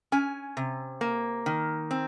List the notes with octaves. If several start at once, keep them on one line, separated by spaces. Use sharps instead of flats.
C#4 G#5
C3
A#3
D#3
C4